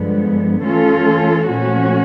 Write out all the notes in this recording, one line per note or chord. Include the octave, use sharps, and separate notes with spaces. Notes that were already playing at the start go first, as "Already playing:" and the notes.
Already playing: G2 D3 F3 G#3 B3
E3 A3 C#4 F4 A4
A#2 F3 A3 C#4 F#4